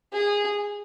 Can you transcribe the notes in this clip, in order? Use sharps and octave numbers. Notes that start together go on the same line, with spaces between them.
G#4